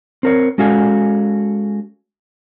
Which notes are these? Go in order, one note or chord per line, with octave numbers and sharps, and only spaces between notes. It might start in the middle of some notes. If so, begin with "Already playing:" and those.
C4 A#4 C#5
G#3 C#4 F#4 A4 F5 G#5